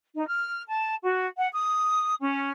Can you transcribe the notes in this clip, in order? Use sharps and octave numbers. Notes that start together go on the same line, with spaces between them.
D#4
F6
A5
F#4
F#5
D#6
C#4